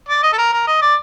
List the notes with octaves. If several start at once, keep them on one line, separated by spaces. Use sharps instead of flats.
D5
D#5
A4
A#4
A#4
D#5
D5